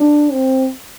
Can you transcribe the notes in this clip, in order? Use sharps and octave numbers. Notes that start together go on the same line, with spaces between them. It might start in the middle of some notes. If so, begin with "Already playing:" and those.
Already playing: D4
C4